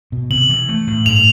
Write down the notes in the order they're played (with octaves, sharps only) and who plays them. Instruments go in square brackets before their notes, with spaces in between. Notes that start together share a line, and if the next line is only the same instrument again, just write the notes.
[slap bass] B2
[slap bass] C3 [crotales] F#7
[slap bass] E3
A3
A2
[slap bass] G2 [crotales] F7